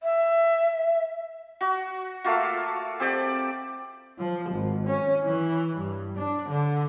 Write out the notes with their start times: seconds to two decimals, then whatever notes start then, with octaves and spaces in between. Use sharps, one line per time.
0.03 E5
1.61 F#4
2.24 A3 A#3 F4 F#4
3.00 C4 G4 D5
4.19 F3
4.50 G#1
4.87 C#4
5.23 E3
5.76 G2
6.18 D4
6.49 D3